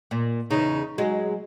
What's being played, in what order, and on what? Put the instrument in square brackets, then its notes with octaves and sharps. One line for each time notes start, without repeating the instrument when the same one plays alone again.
[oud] A#2
[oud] E2 C#3 [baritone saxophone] D#4
[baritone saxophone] F#3 [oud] G#3